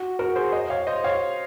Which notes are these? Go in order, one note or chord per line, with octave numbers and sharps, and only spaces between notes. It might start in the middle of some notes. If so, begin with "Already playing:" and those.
Already playing: F#4
F#4 A#4
G#4 C5
C5 D#5
C#5 F5
C5 D#5
C#5 F5